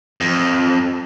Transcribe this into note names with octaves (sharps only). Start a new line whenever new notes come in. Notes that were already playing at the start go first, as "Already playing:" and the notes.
F2